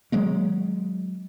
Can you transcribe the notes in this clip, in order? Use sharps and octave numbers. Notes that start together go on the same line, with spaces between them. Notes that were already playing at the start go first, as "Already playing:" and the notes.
D#3 F#3 G#3 A#3